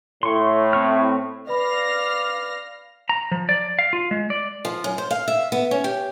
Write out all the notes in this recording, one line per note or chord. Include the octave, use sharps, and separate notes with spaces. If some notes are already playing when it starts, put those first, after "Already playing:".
A2 C6 C#6
C4 C#6 F6
B4 D5 F5 B5 F6 A#6
A#5
F3
D5
F5
F4
G#3
D5
F3
F#2
C5
F5
E5
B3
C#4
G4